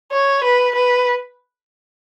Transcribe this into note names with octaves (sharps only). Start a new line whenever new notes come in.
C#5
B4
B4